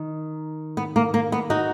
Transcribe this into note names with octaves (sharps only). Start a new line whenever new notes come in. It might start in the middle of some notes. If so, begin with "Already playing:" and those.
Already playing: D#3
B3
A#3
A#3
B3
D#4 F#4